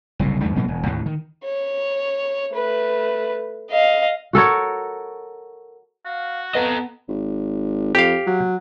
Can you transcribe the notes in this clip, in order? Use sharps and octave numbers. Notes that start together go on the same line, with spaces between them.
F#1 C2 A2
E2 G2 A3
G#2 B2 F#3 A#3
E1
D#2 A2 D#3
D#3
C#5
A3 B4
D#5 F5
F#4 A4 A#4 C#5
F#4 F5
B3 A4 D#5 A#5
G#1
F2 G4 F5
F#3